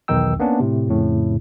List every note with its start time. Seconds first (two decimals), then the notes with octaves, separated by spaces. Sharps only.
0.08 B1 E2 D#3 D#4 G5 E6
0.39 A#3 B3 C#4 D4
0.60 A2 C3
0.88 F2 A2 C#3